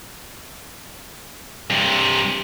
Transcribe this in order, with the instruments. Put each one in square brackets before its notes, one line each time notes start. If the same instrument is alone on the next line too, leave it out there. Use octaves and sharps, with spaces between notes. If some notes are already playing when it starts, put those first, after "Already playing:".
[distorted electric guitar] G2 C3